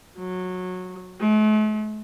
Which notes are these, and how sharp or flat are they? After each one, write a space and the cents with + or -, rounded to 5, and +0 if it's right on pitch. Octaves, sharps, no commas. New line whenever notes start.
F#3 -15
A3 -45